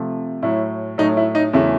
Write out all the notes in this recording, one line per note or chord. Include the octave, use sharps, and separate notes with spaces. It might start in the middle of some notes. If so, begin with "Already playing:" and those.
Already playing: C3 F3 A3
A2 F#3 A3 E4
A2 F#3 A3 D#4
E4
D#4
E2 C#3 F#3 A3 E4